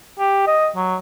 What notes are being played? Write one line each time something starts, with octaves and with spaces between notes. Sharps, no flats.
G4
D#5
F#3